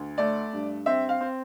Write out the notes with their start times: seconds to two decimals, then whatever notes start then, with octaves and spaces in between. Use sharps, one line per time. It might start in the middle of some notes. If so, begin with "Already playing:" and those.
Already playing: D2
0.18 A3 D5
0.53 G2
0.86 C4 E5
1.09 F5
1.21 C4